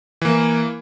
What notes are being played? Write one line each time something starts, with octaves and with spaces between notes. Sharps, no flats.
E3 A#3